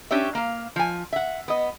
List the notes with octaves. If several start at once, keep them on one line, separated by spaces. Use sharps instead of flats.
C#4 D4 G4 C#5 E5
A#3 F5
F3 G#5
E5 F#5
B3 D#5